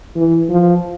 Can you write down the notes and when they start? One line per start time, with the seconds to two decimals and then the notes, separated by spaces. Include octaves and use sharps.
0.16 E3
0.49 F3